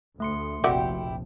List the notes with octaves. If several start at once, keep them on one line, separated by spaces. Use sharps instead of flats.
D2 A3 C6 C#7
F1 A#1 F2 E4 F#4 G4 D5 E5